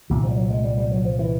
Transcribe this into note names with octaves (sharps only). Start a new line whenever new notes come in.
C2 A#2 D#3
F3
G3
F#3
G#3
G3
G3
F#3
F3
E3